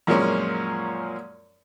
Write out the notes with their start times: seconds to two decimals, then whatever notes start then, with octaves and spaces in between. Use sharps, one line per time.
0.07 F#2 A#2 F3 G#3 A#3 C#4